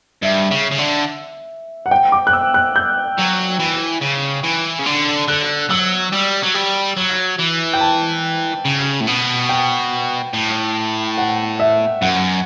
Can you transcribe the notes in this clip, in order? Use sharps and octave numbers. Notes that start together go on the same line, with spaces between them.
G2 E5
C#3
C#3
D3
F#5
G5
D6
F#6
E6
F#6
G6
F#3
E3
C#3
E3
C#3
D3
D3 F#6
F#3 E6
G3
F#3
G3
F#3
E3
G5
A5
C#3
A2
B2
G5
A2
F#5
E5
F#2 F#5